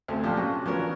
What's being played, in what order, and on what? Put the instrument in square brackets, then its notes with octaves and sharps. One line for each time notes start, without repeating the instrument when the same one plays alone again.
[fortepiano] D2 [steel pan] C4 A4 C5 [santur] G#5
[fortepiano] A#2 F3 [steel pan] F#3 [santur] D4 F4 G4
[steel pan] A#3 G#4 [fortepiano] C#4 [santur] F#4
[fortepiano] F3 B3 A#4 [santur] C#4 C#5
[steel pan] E3 D4